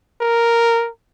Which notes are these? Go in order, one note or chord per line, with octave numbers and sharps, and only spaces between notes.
A#4